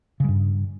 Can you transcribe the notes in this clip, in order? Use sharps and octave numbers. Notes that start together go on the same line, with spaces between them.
G2 C#3 G3